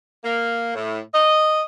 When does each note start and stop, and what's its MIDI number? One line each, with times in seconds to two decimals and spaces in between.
0.24 0.73 58
0.75 1.00 45
1.14 1.62 75